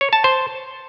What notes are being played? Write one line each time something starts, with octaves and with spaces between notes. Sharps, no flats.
C#5
A5
C5